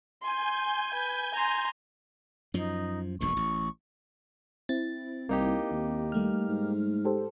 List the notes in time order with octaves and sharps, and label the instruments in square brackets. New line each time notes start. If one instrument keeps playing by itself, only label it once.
[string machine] G#5 G6 [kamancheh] C6
[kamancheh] B4
A#5 C6
[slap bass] F#2 F3 [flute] D#4
[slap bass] E1 A#1 G2 [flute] C#6
[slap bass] A1
[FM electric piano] C4 E4 [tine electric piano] A6
[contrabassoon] C2 [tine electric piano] A#3 D#4 G4
[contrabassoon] D#2
[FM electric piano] G3 A3 F6
[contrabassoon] G#2
[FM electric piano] G4 A4 C5